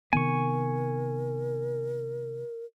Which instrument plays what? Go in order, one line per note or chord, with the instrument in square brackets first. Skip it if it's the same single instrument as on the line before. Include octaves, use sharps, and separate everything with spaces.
[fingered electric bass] C3 D#3 B3 [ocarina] A#4 [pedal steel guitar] G#5 C#6